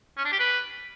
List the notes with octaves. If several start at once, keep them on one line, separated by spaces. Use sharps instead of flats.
C#4
D4
G4
B4